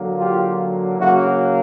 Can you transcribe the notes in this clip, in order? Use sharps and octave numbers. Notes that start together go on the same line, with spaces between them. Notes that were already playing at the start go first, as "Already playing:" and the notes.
Already playing: D3 F#3 A#3
F4 G4
C#3 F#3 A#3 E4 F#4